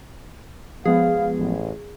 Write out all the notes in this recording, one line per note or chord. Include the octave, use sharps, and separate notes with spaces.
F3 G#3 B3 G#4 F5
A1